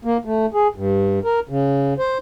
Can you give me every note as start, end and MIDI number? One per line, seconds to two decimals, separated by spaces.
0.05 0.17 58
0.25 0.46 57
0.54 0.67 68
0.76 1.19 43
1.25 1.39 70
1.49 1.94 49
1.99 2.18 72